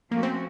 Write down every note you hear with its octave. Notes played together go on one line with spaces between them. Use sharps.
F3 A3 A#3 C#4 F#4
C4